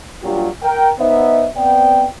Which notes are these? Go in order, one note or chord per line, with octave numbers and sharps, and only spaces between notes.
A#2 F#3 G3 D4 F4 G4
A#4 G5
B3 D#4 C5 E5
B3 C4 D5 G5